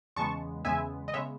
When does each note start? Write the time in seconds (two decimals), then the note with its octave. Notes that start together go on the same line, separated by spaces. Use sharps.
0.16 E2 C#3 G#3 B3 A5 C#6
0.65 E2 C#3 G#3 B3 E5 G#5
1.08 D#5
1.14 C#3 G#3 B3 C#5 E5